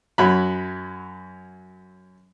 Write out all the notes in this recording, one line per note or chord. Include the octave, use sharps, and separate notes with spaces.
F#2 F#3 B5